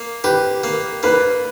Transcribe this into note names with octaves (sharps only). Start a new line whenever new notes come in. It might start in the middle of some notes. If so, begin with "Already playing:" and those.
Already playing: A#3
G4 B4
A#3
A#3 B4